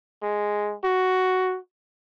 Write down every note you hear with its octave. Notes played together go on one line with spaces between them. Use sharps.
G#3
F#4